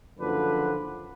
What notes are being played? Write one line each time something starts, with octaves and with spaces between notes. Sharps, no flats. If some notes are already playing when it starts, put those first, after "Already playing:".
F#1 D3 F3 D4 B4